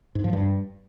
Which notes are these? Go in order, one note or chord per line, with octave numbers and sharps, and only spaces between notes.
G#2
F3
G2